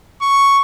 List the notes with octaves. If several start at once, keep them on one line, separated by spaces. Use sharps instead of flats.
C#6